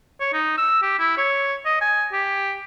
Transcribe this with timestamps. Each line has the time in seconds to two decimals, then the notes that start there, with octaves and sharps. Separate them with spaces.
0.20 C#5
0.33 D#4
0.58 E6
0.82 G4
0.99 E4
1.17 C#5
1.65 D#5
1.81 G#5
2.12 G4